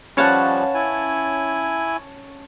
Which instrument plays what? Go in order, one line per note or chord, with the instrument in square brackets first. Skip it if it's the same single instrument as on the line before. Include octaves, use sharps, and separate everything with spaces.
[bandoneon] F3 G3 [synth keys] C#4 C#5 A5 [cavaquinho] B4 F5 F#5
[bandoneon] E4 G#5